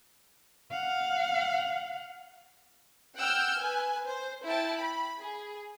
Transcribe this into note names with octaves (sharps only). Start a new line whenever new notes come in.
F5 F#5
F#5 G5 E6 F6 G6
B4 G#5
C5
E4 G5 A5
B5
G#4